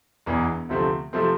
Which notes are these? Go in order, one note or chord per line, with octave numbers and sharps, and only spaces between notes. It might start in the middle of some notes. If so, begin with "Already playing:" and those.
E1 E2 E3
D2 C3 F3 A3 C4
C3 F3 A3 C4